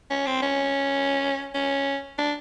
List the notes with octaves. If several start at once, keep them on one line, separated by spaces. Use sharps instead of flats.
C#4
C4
C#4
C#4
D4